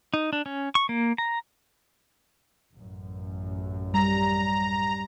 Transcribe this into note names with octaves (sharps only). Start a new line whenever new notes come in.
D#4
D4
C#4
C#6
A#3
A#5
A1 F#2
G3 A#5